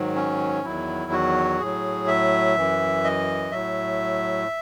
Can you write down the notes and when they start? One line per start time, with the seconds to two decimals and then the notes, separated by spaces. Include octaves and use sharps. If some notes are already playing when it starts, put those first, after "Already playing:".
Already playing: G#2 D#3 F#3
0.15 C#4
0.63 E2 D#3 F#3 E4
1.12 F#4
1.60 A2 F#3 G#4
2.07 E5
2.56 F#2 E3
3.04 D#5
3.51 A2 F#3 E5